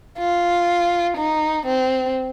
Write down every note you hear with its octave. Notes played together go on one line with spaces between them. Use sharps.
F4
D#4
C4